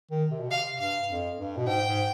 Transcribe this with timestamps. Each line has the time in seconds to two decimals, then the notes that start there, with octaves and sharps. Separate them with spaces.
0.11 D#3
0.31 C3
0.40 B2
0.50 C3 F5
0.79 G2 F5
1.09 F2
1.38 G2
1.57 B2
1.67 G#2 G5
1.87 G#2